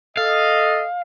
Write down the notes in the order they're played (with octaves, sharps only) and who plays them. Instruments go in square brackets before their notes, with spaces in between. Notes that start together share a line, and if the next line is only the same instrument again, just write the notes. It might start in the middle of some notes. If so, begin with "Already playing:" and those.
[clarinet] A4 [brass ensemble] D#5 [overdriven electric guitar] F5